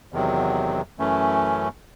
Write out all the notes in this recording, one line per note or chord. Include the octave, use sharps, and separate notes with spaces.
E2 C3 D#3 F#3
F#2 E3 A3 C#4